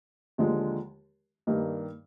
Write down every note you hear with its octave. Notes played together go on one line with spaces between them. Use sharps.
D#2 D3 F3 G#3
G2 D#3 G3 A#3 D#4